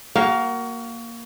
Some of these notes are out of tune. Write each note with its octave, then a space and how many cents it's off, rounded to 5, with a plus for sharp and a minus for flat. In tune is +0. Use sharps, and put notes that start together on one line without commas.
A#3 +0 F#4 +25 F5 +0